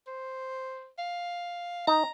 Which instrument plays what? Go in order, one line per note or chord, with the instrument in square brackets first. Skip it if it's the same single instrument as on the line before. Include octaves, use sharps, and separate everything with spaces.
[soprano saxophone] C5
F5
[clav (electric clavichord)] D#4 [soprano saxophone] A#5